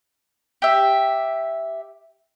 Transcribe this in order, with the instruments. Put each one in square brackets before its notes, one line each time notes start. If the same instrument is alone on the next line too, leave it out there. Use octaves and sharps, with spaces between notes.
[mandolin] G4 E5